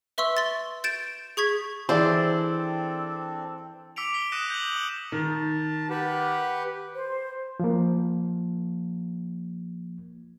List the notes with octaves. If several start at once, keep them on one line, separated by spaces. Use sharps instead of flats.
B4 E5 C6 C#6 E6
C6 A6
G6 A6 D7 E7
G#4 C#6 G#6 B6
E3 C4 D4 G#4 A4 C5 D5 E6
D6 E6 B6 C#7 D7 F7
D6 B6 G7
D#6 F#6 A#6 C#7 D#7 E7
G6 F#7
D#6 E7 F#7
D#3 A5
G4 B4 F#5
C5
F3 A#3